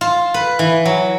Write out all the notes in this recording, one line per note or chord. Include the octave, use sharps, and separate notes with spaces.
F4
B4
E3
F#3